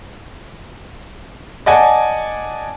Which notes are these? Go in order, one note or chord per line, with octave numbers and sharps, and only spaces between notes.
D5 D#5 F#5 G#5 A5